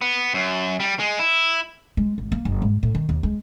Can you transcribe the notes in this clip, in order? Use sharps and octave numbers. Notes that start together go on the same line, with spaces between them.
B3
F#2
G3
G#3
E4
G#3
G#1
A#3
F#1
G#2
A2
D#3
D#2
G#3